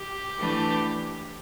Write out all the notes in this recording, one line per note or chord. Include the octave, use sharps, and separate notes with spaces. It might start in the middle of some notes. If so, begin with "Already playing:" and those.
Already playing: G4
E3 A3 D4